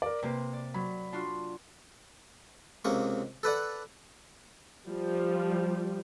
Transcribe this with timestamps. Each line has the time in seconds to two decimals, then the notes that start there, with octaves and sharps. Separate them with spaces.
0.02 A#4 D5
0.23 C3 A#3 G4 B4
0.53 D5
0.74 F#3 B5
1.12 D4 F4 F#4
2.85 C#2 C3 A#3 C#6
3.43 A4 B4 D5 F#5
4.88 F3 G3